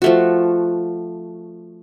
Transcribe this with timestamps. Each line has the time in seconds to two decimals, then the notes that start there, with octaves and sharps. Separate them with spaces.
0.02 F3 A3 F#4